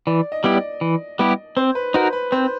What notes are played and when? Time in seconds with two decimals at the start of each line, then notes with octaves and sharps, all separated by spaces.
0.07 E3 D5
0.32 D#5
0.44 G3 B3 E4 G4
0.57 D5
0.81 E3
1.19 G3 B3 E4 G4
1.57 C4 C5
1.75 B4
1.94 D#4 F#4 A#4 C5
2.13 B4
2.32 C4 C5